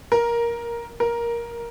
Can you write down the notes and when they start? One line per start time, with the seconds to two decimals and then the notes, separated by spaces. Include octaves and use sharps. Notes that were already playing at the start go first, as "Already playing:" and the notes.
0.12 A#4
1.00 A#4